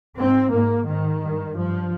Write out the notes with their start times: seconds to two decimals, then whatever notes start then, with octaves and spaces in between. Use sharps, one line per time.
0.18 G#2 C4
0.51 G#2 A#3
0.86 G#2 D#3
1.22 G2
1.56 G2 F3